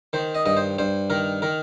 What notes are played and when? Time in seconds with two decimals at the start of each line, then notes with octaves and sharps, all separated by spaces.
0.13 D#3 C5
0.35 D#5
0.46 G2 D#5
0.57 C5
0.79 G2 C5
1.10 D#3 A#4
1.42 D#3 A#4